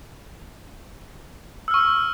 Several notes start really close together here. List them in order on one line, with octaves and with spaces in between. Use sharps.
E6 F6 C#6